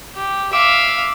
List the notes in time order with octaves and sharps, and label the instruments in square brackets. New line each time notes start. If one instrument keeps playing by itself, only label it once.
[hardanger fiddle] G4
[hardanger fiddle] E5 F5 [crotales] D6 E6 D7